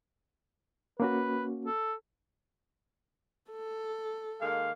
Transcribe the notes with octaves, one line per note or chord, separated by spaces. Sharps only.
A#3 C#4 F#4 B4
A4
A4
D#3 G#3 A#3 F5